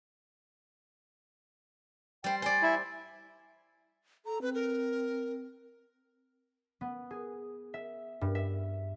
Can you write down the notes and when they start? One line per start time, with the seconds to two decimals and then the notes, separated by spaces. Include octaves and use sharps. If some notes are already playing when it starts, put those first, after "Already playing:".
2.24 G3 C5 G5
2.42 C5 D5 G#5
2.62 E4
4.26 A4 A#5
4.42 C4 B4
4.54 A#4
6.81 B3
7.11 G#4
7.74 E5
8.21 G2
8.35 E5